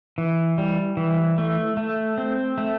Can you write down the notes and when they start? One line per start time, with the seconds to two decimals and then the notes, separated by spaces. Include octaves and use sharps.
0.18 E3
0.58 G3
0.97 E3
1.38 A3
1.77 A3
2.18 C4
2.58 A3